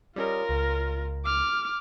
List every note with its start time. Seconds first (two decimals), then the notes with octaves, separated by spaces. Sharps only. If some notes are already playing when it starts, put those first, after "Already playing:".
0.16 G3 C#4 F4 A#4 D#5
0.49 C#2
1.25 D6 F6